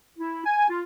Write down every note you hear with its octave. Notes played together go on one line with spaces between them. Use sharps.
E4
G#5
F4